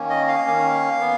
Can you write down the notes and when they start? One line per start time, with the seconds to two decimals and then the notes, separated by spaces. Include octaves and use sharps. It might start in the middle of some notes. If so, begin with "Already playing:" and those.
Already playing: D#3 A#3 C#4
0.10 D#5
0.28 F5
0.46 D#3 A#3 C#4
1.01 B3